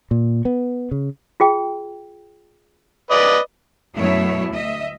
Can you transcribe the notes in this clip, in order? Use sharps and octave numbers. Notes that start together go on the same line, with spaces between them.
A#2
B3
C#3
F4 G#4 G5
B4 D5 D#5
F#2 B2 F#3 A3 E4 C#5
D2 D#5 E5